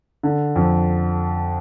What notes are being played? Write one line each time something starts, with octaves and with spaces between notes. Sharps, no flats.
D3
F2